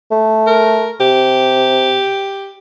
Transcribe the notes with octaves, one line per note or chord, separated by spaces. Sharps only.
A3
A#4
C3 G4